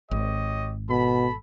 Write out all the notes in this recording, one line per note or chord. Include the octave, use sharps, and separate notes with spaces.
G#1 G4 C#5 D#5
B2 A4 B5